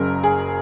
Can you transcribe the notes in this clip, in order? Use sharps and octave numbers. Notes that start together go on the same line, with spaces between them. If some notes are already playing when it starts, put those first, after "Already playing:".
Already playing: F#1 F#2 C#3 A#4
G#4